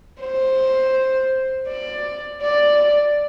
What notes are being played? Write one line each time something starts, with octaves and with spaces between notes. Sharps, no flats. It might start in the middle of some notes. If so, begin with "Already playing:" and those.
C5
D5
D5